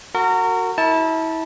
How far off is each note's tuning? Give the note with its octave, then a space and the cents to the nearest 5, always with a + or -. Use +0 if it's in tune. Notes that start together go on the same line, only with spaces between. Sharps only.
F#4 +0 A#4 -30
E4 -30 A5 +0